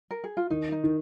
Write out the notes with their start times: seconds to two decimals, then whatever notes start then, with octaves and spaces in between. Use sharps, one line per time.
0.11 A#4
0.24 G#4
0.37 F4
0.50 D#3 D#4
0.72 D#4
0.84 D#3